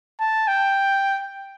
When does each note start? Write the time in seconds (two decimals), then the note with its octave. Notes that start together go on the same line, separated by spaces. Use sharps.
0.20 A5
0.48 G5